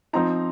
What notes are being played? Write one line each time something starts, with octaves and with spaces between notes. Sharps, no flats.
F3 C4 D#4 A#5